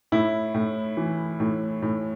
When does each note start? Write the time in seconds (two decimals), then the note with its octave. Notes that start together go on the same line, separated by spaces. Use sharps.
0.12 A2 E4
0.54 A2
0.97 E3
1.40 A2
1.82 A2